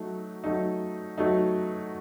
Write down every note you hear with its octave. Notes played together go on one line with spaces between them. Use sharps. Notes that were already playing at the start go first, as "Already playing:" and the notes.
Already playing: F#3 A3 D#4
F#3 A3 D#4
F#3 A3 D#4